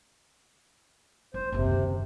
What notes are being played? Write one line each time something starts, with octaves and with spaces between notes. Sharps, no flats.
D#4 C5
F#1 D#2 C3